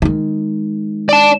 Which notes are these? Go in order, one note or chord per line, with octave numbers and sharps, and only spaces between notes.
D#3 G#3
D5 A5